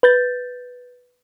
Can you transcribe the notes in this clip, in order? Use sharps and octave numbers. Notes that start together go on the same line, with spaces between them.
B4 G6 A6